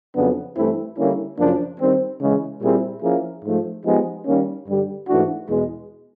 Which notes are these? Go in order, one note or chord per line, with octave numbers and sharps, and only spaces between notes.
F2 C#3 F#3 B3 D4
G2 E3 A3 C4 E4
D3 G3 A#3 C#4 E4
F#2 C#3 F3 A#3 D4
D#3 G3 C4
C#3 E3 G#3
A#2 G3 C4 E4 G#4
F3 A#3 C#4 E4 G#4
G#2 F3 A3
F3 G#3 B3 D#4 G4
D#3 G3 A#3 C#4
G2 D3 G3
G#2 E3 A3 D4 F#4
E2 B2 G#3